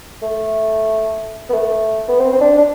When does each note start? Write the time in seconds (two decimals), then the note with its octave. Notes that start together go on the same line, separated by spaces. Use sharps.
0.23 A3
1.49 B3
1.54 A3
2.08 B3
2.20 C4
2.33 C4
2.41 D4
2.58 D4